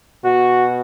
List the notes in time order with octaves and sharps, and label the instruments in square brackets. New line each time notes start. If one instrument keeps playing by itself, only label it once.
[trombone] B2 [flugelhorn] F#4